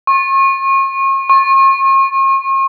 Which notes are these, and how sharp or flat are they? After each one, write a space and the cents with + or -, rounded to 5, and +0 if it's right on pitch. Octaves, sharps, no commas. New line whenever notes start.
C#6 -40
C#6 -45